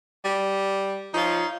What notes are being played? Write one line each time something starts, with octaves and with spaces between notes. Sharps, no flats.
G3
F3 D#4 F4 C#5